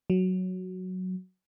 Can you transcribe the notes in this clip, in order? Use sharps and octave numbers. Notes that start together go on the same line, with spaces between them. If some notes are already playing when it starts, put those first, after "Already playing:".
F#3